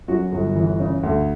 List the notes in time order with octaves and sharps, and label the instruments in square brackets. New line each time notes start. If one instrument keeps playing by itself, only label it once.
[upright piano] F#2 F#4
G1
E3
C#3
D2